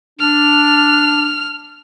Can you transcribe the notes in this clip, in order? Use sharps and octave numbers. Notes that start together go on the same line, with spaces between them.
D4 F6